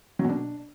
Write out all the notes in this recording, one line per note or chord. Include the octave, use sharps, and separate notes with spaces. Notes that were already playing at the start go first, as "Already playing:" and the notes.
F#3
B2
D4